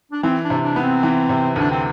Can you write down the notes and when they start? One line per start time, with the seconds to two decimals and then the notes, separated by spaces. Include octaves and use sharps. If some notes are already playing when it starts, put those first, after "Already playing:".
0.12 D4
0.23 E3 C4
0.44 D4
0.50 C3
0.63 D4
0.76 B3
0.83 C4
1.03 E3
1.29 C3
1.56 D2 D4
1.71 C4